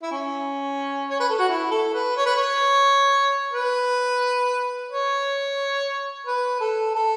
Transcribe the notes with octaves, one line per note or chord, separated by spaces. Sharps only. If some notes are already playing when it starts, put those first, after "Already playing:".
E4
C#4
C#5
B4
A4
F#4
E4
A4
B4
C#5
B4
C#5
B4
C#5
B4
A4
A4